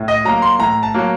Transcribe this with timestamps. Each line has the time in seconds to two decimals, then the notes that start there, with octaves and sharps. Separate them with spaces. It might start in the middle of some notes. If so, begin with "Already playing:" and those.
Already playing: A2
0.08 D#5
0.24 F#3 A#3 A#5
0.42 C6
0.59 A2 A#5
0.83 A5
0.95 F#3 A#3